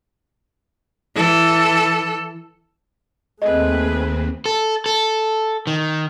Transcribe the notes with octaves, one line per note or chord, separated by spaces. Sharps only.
E3 A4
D#2 A3 C4 G#4 B4 D#5
A4
A4
D#3